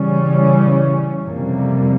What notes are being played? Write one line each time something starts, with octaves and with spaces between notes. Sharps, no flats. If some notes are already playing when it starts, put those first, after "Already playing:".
Already playing: C#3 E3 G3 C#4
F2 C3 G3 A#3